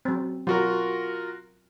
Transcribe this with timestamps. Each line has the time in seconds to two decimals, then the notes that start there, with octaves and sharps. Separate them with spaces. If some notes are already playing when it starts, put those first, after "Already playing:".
0.05 F#3 C4
0.47 F#3 F4 F#4 A#4